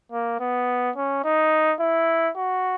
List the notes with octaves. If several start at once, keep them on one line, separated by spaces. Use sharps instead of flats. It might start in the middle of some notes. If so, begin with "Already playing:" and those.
A#3
B3
C#4
D#4
E4
F#4